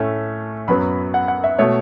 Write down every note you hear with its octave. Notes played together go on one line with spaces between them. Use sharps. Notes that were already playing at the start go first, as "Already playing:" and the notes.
Already playing: A2 A3 C#4
F#2 F#3 B3 B5
F#5
F#5
E5
B2 A3 C#5